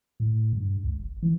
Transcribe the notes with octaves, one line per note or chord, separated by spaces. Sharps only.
A2
G2
C#2
F#1
E3